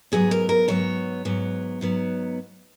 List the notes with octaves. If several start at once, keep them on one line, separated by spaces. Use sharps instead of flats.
G#2 F#3 B3 G#4
A#4
A#4
G#2 F#3 B3 C#5
G#2 F#3 B3
G#2 F#3 B3